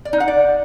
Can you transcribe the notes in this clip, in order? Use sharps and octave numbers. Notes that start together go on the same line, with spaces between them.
D5
D#4
F#5
D5